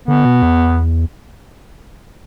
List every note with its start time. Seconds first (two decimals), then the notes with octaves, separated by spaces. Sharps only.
0.08 D3 B3
0.25 B2
0.42 E2